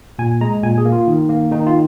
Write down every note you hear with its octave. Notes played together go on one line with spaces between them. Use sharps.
A#2 G#5
G#3 A#5
A#2 G#5
G#4
A#3
F4
D#3
A#3
D#3 D#4
F4